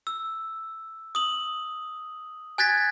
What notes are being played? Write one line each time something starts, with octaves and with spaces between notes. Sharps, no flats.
E6
D#6 F#7
G#5 F#6 G#6 A6 B6